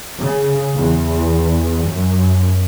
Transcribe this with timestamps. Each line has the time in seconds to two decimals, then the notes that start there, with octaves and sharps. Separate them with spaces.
0.19 C#3
0.75 E2
1.85 F#2